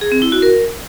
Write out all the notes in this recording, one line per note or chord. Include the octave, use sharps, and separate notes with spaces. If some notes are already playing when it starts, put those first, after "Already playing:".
G#4
C4
E4
F#4
A#4